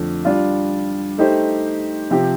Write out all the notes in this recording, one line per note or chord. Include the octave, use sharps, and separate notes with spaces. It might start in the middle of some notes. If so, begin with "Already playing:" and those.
Already playing: F2 D3 A3
G3 D4 F4
A3 D#4 G4 C5
C3 F3 C4 G4